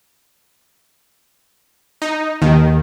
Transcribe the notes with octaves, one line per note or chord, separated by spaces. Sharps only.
D#4
D#2 D#3